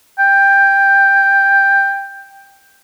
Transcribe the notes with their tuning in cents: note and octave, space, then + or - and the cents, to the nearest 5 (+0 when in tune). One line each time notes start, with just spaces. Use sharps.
G5 +10